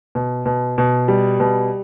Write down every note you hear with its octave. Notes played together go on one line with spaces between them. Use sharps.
B2
B2
B2
G3
B2